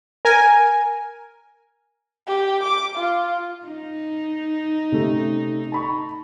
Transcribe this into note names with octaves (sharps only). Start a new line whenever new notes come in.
A#4 G#5
G4
D6
F4
D#4
C3 A3 C#4
A5 B5 C#6